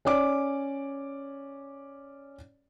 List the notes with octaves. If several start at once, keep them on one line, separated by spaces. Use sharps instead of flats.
C#4 C#5 D5 D6